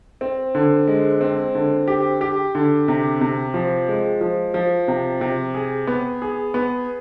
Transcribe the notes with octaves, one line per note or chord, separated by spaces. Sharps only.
C4
D3
G#3
C4
D3
G4
G4
D3
C3
C3
F3
G#3
F3
F3
C3
C3
G#4
B3
G#4
B3